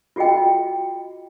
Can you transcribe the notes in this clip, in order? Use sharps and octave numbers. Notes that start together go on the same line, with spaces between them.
F4 F#4 G#4 D#5 G5